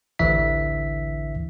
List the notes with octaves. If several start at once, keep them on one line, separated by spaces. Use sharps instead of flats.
A1 D2 D3 E3 E5 B6